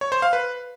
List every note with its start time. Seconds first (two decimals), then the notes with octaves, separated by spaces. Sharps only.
0.01 C#5
0.12 C5
0.22 F5
0.33 B4